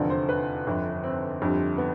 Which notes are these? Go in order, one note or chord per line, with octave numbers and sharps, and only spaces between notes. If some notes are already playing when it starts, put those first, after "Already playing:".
Already playing: F1 E2 D3 F3 D5
C5
B4
G1 F2 D3
C4
G1 F2 D3 G3
B3